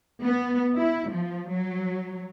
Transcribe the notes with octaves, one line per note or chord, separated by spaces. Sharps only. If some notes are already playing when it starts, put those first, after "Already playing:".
B3
E4
F3
F#3